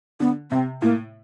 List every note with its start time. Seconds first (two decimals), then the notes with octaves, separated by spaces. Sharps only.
0.20 D3 B3
0.51 C3 C4
0.82 A2 A#3